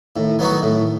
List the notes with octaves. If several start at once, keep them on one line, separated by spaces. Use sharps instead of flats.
A2 D#3
E3
E3 F#3 B3 D#4 F#4
D#3
A2
E3